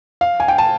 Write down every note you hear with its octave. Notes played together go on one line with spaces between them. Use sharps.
F5
G#5
G5
A5